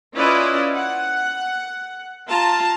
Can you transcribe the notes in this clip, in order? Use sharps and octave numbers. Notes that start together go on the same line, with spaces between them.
C#4 E4 F4 B4 D5 D#5
F#5
F4 A5 A#5